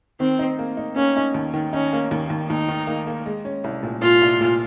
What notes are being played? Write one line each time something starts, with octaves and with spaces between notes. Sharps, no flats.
D#3 C4
D#4
A#3
D#4
A#3 C#4
D#4
D#2
D#3
C#4 D#4
A#3
D#2
D#2
D#2 D#4
D#3
A#3
A#3
G#3
C#4
C2
A#2
A#2 F4
C2
A#2